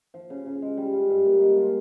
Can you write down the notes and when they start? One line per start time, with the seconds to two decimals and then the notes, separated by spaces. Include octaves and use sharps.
0.14 F3
0.30 C#3
0.46 C#3
0.62 G#3
0.77 G3
0.93 F4
1.09 G2
1.26 A#3
1.41 G#3
1.57 F4